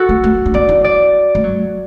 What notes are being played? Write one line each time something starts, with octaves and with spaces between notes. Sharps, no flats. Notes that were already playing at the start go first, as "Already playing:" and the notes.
Already playing: F#4 A4
A3
A3
D4
B3 D5
E4
D5
A3
F#3